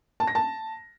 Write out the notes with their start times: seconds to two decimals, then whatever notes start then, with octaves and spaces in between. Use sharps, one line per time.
0.20 A5
0.28 A#6
0.35 A5